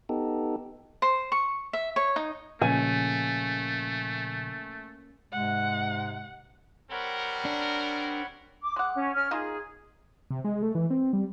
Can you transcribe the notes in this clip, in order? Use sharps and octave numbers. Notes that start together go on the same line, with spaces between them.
B3 D#4 G4 A4
C5
C#6
E5
C#5
D#4
A#2 C#3 F3 A3 A#3 C#4 G#4 G#5
G#2 C3 G#3 F#5
G3 C4 A#4 C#5 F#5 B5
D4
D6
G#3 F#5 D6
C#4
C#4 F6
A#3 D#4 F4 G#4
C3
G#3
A3
E3
C4
G3